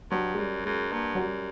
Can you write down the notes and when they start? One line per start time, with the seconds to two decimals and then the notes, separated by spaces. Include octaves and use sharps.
0.11 G2 F#3
0.34 G#3
0.38 F#2 G3
0.65 F#2 G#3
0.92 G2 A#3
1.15 F#3
1.19 F#2 G3